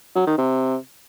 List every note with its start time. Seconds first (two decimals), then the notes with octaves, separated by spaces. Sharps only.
0.15 F#3
0.27 D#3
0.38 C3